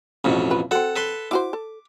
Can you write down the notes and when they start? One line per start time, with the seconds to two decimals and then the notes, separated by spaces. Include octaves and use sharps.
0.24 A1 F2 B2
0.50 F4 B4
0.71 C4 F#4 A4 F#5
0.96 A4 B4 C6
1.31 E4 F#4 C5 D6
1.53 A4